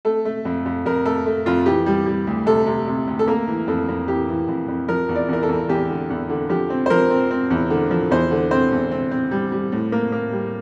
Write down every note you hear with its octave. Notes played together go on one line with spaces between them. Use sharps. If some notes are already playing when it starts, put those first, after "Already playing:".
A3 A4
A3
F2
F2
F2 A#4
A3 A4
A3
F2 F4
E3 G4
G3
G3
D2
C3 A4
C3
C3
D2
A4
A#3 A#4
E3
F2 A4
F2
E3 G4
E3
F2
F2
F3 A#4
E2
D5
E2 A#4
A4
E2
E2 G4
D3
E2
D3
F3 G4
C4
C5
F3 A#4
C4
C4
E2
D3
F3
E2 C5
D3
C4 C5
E2
C4
C4
G3
G3
A2
A#3
A#3
G3